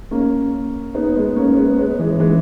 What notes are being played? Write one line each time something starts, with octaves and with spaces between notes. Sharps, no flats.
A#3 C#4
B3 D#4
G#3 B3
A#3 C#4
G#3 B3
G#3 B3
E3 G#3
E3 G#3